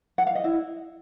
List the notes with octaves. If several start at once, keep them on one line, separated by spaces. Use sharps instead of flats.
F#5
F5
D#5
E4